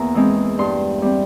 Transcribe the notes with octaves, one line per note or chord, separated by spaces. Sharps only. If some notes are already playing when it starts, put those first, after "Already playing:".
Already playing: E2 A#3 A#5
E3 G#3 C4
G2 C6
G3 C4